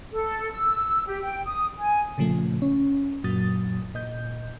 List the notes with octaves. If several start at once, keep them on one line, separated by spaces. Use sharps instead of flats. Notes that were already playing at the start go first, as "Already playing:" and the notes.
A4
E6
G4
G5
D#6
G#5
A#2 C#3 F3 A3
C#4
F#2 A#2 F#3 D#6 A6
A#2 D#5 G6